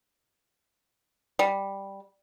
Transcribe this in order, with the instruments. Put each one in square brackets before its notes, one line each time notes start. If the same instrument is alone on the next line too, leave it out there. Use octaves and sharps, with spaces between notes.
[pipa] G3